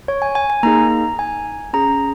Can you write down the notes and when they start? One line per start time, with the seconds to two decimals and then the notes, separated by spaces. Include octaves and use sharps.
0.08 C#5
0.22 G#5
0.35 G#5
0.50 G#5
0.63 A#3 D#4 G#4 A#5
1.19 G#5
1.73 C#4 G#4 A#5